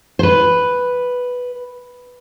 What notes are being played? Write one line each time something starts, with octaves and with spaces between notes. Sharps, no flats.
C5
B4